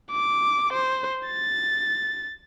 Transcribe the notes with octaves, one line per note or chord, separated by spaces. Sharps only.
D6
C5
A6